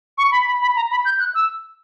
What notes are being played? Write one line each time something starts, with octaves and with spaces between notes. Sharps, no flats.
C#6
B5
B5
B5
A#5
B5
G6
F#6
E6